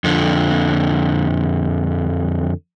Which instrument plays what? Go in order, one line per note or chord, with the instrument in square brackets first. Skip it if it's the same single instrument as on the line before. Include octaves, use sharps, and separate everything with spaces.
[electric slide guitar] F2 D3